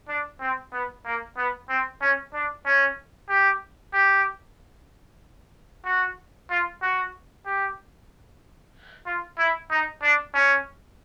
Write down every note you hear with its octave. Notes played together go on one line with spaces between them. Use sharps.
D4
C4
B3
A#3
B3
C4
C#4
D4
C#4
G4
G4
F#4
F4
F#4
G4
F4
E4
D#4
D4
C#4